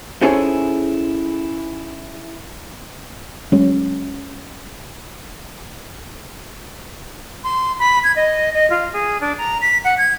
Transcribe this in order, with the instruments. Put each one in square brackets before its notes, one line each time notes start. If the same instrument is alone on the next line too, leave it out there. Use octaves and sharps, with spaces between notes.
[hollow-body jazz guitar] C#4 D#4 E4 G#4 A4 C5
[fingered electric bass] F#3 G#3 C#4
[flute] C6
B5
G#6
D#5
D#5
F4
G#4
D4
A#5
B6
F#5
G#6